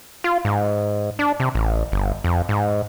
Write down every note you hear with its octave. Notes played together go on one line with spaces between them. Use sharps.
F4
G#2
D4
C3
A1
G1
F2
G#2